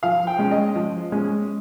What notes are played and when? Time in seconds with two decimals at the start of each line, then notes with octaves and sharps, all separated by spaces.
0.03 F3 F5
0.27 G5
0.39 G#3 C#4
0.51 D#5
0.76 F3
1.12 G#3 C#4